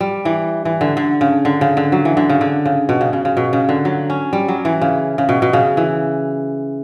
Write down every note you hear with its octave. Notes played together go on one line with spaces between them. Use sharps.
G3
E3
E3
D3
D3
C#3
D3
C#3
D3
F#3
E3
D3
C#3
D3
C#3
B2
C#3
C#3
C#3
B2
C#3
D3
F#3
C#4
G3
F#3
E3
C#3
C#3
B2
B2
C#3
E3